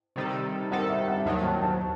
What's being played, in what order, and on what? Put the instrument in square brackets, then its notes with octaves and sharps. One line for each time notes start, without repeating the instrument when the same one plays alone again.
[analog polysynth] C3 D#3 G3 D#4 A4
[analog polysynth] C3 D#3 G3 D#4 A4 [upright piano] F#5
[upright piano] E5
F#5
E5
[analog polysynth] D#2 D#3 F#3 [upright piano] F#5
[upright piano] A5
A5